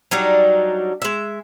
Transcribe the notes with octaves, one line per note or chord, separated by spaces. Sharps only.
F#3 G3 D4 D#4
G#3 E5